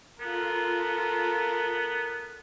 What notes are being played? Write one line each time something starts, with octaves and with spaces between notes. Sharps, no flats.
B3 F4 A4 A#4